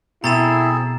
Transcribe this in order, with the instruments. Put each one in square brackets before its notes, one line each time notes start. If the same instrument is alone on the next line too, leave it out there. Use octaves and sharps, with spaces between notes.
[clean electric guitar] B2 [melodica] C4 G#4 A4 [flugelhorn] E4 [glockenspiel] A#5 A6 E7